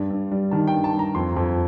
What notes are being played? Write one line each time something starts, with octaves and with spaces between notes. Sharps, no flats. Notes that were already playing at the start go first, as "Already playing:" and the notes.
Already playing: G2 G3
G2
G3
D#3 A5
G5
G2
A5
G2
A#5
F2 C6
F2